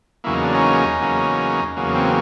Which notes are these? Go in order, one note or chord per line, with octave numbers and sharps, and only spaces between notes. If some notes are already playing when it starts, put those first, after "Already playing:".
E2 C#3 F#3 A#3 E4
D#4
D4
C#4 D#4
E2 C#3 F#3 A#3
E2 C#3 F#3 A#3
C4